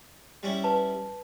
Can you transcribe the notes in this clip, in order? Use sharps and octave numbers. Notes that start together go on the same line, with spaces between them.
G3 C#4 E4
B4 A5